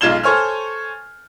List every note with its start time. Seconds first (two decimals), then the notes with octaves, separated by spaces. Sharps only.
0.01 B1 G#3 F4 G#6 E7 G7
0.24 A4 C5 C#5 G#5 F6